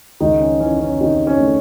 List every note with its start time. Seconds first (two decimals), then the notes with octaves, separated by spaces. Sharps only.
0.20 C#2 D#3 D#4
0.41 C#4
0.60 E3 C#4
0.80 C#4
1.00 C3 D#3 D#4
1.27 C#4
1.40 A3